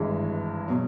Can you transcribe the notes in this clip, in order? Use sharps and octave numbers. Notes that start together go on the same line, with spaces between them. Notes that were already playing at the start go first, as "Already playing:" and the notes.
Already playing: G#1 G2 E3 G#3
B2 F#3